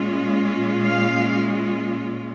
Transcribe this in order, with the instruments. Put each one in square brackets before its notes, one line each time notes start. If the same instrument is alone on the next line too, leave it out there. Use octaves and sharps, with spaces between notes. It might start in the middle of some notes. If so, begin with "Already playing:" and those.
Already playing: [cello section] A#2 G#3 C#4 F4
F5